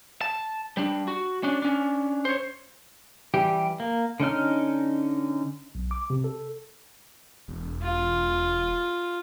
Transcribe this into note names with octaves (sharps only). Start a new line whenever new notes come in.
A5
G3 D4
F#4
C#4 D4
C#4 D4
C5 C#5
E3 G3 G4
A#3
D3 C#4 D#4 F6
B1
D6
C3
A4
E1
F4